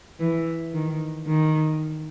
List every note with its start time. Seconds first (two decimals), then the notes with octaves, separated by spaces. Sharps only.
0.20 E3
0.74 D#3
1.27 D#3